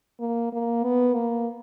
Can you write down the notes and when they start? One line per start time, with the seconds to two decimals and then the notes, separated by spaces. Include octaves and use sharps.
0.20 A#3
0.52 A#3
0.83 B3
1.14 A#3